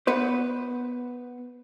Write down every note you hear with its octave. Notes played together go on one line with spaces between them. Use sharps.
B3 B4 C5